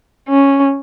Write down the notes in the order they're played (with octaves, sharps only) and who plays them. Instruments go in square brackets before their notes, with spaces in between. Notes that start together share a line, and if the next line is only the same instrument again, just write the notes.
[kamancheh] C#4